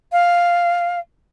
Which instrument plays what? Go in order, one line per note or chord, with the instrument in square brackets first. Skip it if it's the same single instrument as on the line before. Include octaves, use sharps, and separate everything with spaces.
[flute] F5